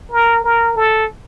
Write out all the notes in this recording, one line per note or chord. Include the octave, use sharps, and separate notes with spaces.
A#4
A#4
A4